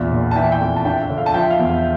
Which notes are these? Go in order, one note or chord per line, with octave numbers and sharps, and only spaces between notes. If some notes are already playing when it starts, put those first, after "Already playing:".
Already playing: A#1 E2 E5
A#2
A5
E3 E5 G5
E5 G5
F2
A5
D4 E5 G5
E5
D3
F5
A5
F3 E5 G5
F5
E2
E5